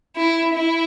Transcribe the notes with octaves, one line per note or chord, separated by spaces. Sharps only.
E4
E4